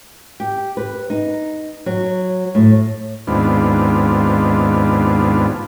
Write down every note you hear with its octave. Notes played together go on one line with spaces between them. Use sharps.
G4
B4
D#4
F#3
A2
D#2 G#2 B3 C4 D4 F4